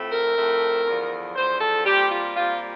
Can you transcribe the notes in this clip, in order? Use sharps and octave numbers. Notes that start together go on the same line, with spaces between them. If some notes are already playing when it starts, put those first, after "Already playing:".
Already playing: A2 F3 A3 C4
A#4
A2 F3 A3 C4
E2 D3 F3
E2 D3 F3 C5
A4
A#2 G3 C4 G4
F4
A#2 G3 C4 F4